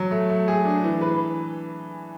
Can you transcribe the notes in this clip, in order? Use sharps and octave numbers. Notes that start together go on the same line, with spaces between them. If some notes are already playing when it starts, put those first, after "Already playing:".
Already playing: F#3
A3
A3
G#4
D4
E3
B4